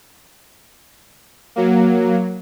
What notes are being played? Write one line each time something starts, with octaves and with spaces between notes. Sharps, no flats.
F#3 A#3